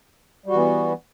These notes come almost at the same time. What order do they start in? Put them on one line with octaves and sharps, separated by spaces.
G3 F#4 E3 B3